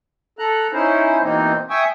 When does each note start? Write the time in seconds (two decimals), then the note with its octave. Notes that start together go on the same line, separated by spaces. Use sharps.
0.39 A4 A#5 F#6
0.73 C#4 D#4 E4 C5
1.22 B2 E3 A#3 C4 D#4
1.70 E5 G5 G#5 C#6 D#6